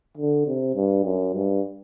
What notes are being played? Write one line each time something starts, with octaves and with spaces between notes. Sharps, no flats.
D3
C3
G2
F#2
G2